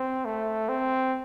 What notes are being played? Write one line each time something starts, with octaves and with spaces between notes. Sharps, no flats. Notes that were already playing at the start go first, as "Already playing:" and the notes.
Already playing: C4
A3
C4